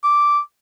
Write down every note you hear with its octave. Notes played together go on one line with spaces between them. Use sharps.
D6